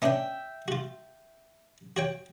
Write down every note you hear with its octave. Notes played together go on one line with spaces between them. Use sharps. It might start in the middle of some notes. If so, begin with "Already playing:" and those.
B3 C#4 D4 E5 G5
F4 F#4
F#4 C#5 G5